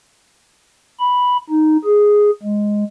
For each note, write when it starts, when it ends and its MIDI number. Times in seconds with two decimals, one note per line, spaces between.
1.00 1.37 83
1.50 1.77 63
1.85 2.31 68
2.43 2.84 56